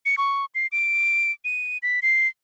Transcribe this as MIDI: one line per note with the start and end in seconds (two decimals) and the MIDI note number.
0.06 0.16 97
0.18 0.46 85
0.55 0.67 96
0.72 1.32 98
1.45 1.78 99
1.83 2.00 95
2.02 2.28 96